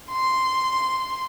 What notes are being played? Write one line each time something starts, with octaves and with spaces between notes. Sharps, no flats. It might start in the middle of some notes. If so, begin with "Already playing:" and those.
C6